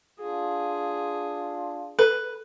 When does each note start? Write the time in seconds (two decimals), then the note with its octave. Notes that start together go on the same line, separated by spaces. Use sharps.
0.20 D4 F4 G#4
1.99 A4 B4